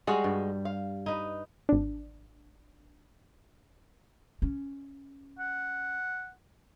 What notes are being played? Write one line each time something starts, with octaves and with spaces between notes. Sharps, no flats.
G3 G#3 F#4 G#4 F#5
G2
F5
D#4 B4
G#1 D4
C#4
F#5